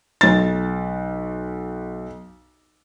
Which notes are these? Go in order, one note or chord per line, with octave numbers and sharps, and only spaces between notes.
B1 A6